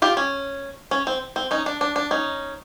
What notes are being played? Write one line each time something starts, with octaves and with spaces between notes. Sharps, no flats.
F4 G4
C#4
C#4
C4
C4
C#4 D#4
D4
D4
D4
C#4 D#4